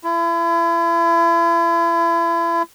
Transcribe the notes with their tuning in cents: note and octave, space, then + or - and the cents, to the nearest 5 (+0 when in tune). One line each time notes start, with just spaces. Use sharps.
E4 +35